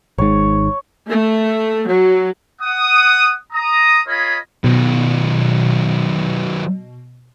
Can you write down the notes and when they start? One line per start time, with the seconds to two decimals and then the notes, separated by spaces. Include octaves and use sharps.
0.18 G#1 G#2 C#5
1.07 A3
1.87 F#3
2.61 F#5 D#6
3.53 A#5 D#6
4.07 F4 G#4 A#4 C#5 D#5 B5
4.64 B2 D#3 F#3